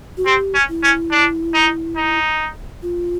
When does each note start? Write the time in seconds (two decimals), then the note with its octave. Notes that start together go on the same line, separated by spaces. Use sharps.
0.17 F#4
0.26 C4 G4
0.54 C#4
0.69 E4
0.83 C#4
1.11 D4
1.54 D#4
1.97 D#4
2.82 F4